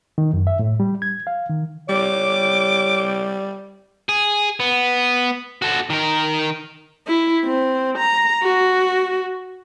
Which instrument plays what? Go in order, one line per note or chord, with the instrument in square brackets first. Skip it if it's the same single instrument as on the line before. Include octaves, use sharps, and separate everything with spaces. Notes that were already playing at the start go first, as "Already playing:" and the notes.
[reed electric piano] D#3
F#2
E5
A2
G3
G#6
F5
D#3
[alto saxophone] G3 [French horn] C#5 [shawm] D6
[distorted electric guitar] G#4
B3
F#4 A4
D#3 A#4
[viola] E4
C4
A#5
F#4